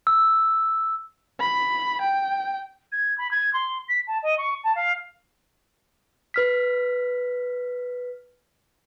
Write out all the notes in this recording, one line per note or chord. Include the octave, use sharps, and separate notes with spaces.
E6
B5
G5
G#6
B5
G#6
C6
B6
A5
D#5
C#6
A5
F5
B4 F6 B6